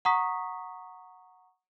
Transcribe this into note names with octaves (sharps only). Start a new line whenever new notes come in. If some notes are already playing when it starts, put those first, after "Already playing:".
F#5 A#5 C#6 D#6 B6